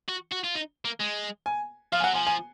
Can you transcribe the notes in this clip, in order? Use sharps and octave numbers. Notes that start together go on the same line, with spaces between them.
F#4
F#4
F4
D#4
A#3
G#3
G#5
F3 F5
G#5
F#3 F#5
F3 G#5
G#5